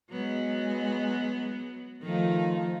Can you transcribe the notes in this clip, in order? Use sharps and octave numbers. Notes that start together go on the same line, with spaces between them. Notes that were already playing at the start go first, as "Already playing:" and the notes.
F#3 G#3 B3
D#3 F3 A3 D#4